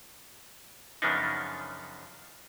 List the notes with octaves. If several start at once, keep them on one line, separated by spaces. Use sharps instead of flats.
F#2 C#3 F3 B3 D4 D#4